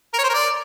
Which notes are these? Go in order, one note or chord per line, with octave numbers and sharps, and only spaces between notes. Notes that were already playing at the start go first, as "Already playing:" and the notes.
A#4
C#5
C5
A#4
D5